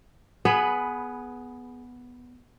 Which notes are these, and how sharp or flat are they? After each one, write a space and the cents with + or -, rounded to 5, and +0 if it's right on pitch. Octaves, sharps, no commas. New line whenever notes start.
B3 +0 G#4 +15 B4 +10